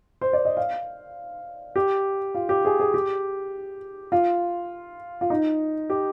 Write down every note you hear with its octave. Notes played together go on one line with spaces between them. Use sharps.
C5
D5
D#5
F5
G4
F4
G4
G#4
G#4
G4
F4
F4
D#4
G4